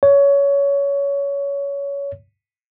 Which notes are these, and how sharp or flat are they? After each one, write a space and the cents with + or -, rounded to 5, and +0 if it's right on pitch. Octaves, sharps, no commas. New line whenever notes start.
C#5 +20